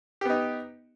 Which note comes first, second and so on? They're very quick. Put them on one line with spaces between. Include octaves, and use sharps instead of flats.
G4 B3 D#4